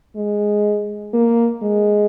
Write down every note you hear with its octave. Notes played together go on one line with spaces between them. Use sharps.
G#3
A#3
G#3